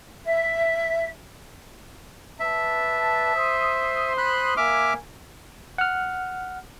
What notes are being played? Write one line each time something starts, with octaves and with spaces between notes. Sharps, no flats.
E5
B4 D5 E5 A5
C5 C6 D#6
B5 F#6
A#3 E5 G#5 D6 F6
F#5 F6